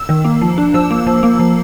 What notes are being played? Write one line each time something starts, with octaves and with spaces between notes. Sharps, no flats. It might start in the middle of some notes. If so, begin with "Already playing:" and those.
Already playing: E6
D#3
A#3
F3
D4
F3 E6
A#3
F3
A#3
F3